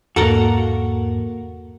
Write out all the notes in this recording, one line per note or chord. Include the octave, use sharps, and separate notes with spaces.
E2 G#2 A#3 F#4 A4 A#4 F#5